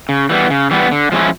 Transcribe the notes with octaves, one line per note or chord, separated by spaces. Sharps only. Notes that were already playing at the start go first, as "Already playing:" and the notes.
C#3
E3 G3 B3
C#3
E3 G3 B3
D3
F3 G#3 C#4 E4